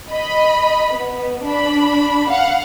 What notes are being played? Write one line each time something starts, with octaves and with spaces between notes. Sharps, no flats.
D#5 B5
B3
D4 B5
F5 F#5